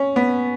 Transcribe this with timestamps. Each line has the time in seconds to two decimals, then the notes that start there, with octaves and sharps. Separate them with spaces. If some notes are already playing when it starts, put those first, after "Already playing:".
Already playing: C#4
0.16 B3